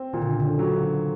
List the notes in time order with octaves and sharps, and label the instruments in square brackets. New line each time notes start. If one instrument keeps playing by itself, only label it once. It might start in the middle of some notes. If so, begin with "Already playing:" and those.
Already playing: [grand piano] C4
[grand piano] A#2 [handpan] D#3
[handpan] D3
C#3
D3
[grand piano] F#3